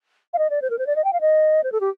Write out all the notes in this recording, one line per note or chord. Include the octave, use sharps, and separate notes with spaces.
F5
D#5
D5
C5
A#4
C5
D5
D#5
G5
F5
D#5
C5
A4
G4